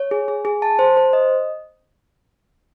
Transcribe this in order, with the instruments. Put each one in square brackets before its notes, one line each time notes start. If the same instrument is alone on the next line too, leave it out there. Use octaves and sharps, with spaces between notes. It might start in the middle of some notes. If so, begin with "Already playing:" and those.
Already playing: [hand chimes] C#5
G#4
G#4
G#4
A5
C5
C5
D#5